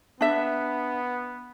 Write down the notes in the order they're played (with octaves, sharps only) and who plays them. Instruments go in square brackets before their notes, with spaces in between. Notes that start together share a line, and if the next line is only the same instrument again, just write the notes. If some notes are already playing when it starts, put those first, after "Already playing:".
[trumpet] B3 [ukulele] D4 E5